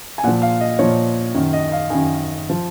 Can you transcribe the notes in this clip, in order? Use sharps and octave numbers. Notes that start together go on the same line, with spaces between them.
G#5
A#2 F3 F#5
F5
D#5
A#2 F3 C#5
F#2 D#3
D#5
F5
F#2 D#3 G#5
F3